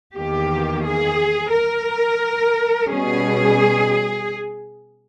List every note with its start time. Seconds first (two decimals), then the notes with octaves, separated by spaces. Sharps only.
0.16 E2 D#3 A#3 G4
0.85 G#4
1.53 A#4
2.88 B2 G3 C#4 G#4